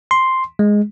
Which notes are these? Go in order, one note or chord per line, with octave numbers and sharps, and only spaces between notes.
C6
G#3